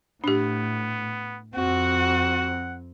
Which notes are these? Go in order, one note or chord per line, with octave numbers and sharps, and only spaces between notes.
A2 B3 D4 G4
F2 C4 F#4 F#5